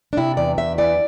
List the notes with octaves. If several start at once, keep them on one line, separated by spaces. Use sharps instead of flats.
D4
C3 E4
E2 D5
E2 E5
E3 D5